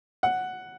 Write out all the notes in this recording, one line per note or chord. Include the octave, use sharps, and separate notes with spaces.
F#5